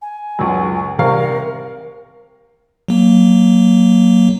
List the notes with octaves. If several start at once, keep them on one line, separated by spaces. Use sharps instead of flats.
G#5
C#2 F#2
C2 C3 A#4 F5
F#3 A#3